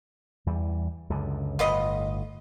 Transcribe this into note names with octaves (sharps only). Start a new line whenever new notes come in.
E2 E3 G3
C#2 F#2 D3
G1 A2 F4 B4 D#5